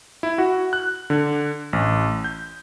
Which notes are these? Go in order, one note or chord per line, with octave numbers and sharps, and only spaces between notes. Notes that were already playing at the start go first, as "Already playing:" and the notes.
E4
F#4
F#6
D3
A1
G6